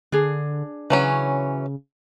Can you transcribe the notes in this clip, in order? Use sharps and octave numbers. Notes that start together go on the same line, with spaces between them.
D3 D4 G#4
C#3 E3 F#3 C#4